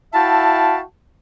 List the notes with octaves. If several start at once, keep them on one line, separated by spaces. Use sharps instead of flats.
E4 F#4 E5 F5 G5 A5